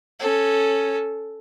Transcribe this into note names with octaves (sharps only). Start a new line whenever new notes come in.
C#4 A4